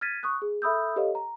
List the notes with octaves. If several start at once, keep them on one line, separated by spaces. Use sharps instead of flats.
F6 G#6 A6 B6 D#7
C#6 D#6 F#6
G#4
A4 E5 B5 D#6 E6 G6
G4 A4 B4 C#5 D#5 F5
A#5